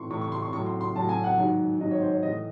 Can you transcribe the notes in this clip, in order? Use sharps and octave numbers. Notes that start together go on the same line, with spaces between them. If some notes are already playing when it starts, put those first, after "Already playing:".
Already playing: A2 E3 C6 C#6
A2 E3 C#6
C#6
C6
C#6
A2 F#3 C#6
C6
C6
A2 F#3 A5
G#5
F#5
G#2 D#3 F#3
G#2 D#3 F#3 D#5
C#5
C5
C#5
A2 E3 D#5